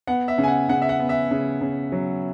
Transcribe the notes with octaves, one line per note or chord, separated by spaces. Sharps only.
B3 F#5
E5
C#3
G#5
F#5
C#3 F#5
E5
F#5
B3
E5
C#3
C#3
F#3